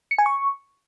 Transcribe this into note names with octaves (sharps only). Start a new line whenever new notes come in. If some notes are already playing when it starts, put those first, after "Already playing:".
C#7
G#5
C#6